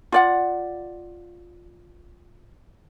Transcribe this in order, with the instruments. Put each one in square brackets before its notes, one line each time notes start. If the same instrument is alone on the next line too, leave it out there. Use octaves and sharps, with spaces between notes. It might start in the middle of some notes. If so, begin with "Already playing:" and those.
[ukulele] F4 D5 F#5